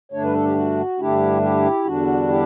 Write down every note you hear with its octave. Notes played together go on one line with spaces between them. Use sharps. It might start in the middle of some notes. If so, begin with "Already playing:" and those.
G2 D3 A3 D4 C#5
B4
A4
G4
F#4
G2 D3 A3 D4 E4 G4
E4 G4
E2 D3 G3 D4 F#4
E4 G4